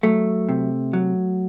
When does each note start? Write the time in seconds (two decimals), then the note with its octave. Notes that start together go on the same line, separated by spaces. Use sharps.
0.03 F#3 A3
0.49 C3
0.93 F#3